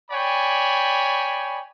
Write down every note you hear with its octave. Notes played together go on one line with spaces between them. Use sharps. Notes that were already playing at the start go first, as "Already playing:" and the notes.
C#5 D5 G5 G#5 B5